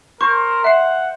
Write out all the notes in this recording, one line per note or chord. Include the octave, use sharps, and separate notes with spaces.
A#4 C5 C#6
E5 F#5 C7